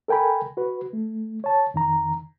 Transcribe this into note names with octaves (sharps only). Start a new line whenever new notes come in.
A4 A#4 G5 G#5 B5
F#4 B4
A3
C#5 A5
F2 D#3 A#5